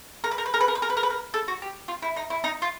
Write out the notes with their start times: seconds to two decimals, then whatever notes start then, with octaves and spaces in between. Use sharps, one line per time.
0.24 A#4
0.31 B4
0.38 A#4
0.46 B4
0.54 A#4
0.61 B4
0.68 A#4
0.75 B4
0.82 A#4
0.90 B4
0.97 A#4
1.03 B4
1.10 A#4
1.34 A4
1.48 F#4
1.62 G4
1.88 F4
2.02 E4
2.16 D#4
2.30 E4
2.44 D#4
2.62 F4